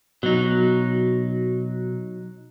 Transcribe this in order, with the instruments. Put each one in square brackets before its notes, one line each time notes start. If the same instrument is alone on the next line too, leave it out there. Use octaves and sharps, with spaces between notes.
[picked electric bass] B2 [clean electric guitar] F#3 D#4